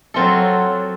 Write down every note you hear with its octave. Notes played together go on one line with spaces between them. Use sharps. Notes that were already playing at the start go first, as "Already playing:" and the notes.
F#3 C4 F4 A4